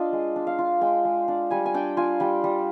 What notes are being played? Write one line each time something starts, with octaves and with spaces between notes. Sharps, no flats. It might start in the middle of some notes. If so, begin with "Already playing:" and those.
Already playing: D4 F4 D#5 F5
G#3
D4
F5
F4
G#3 G5
G#3
D4
G3 G#5
G#5
D4 G5
F4 G#5
G3 G5
G3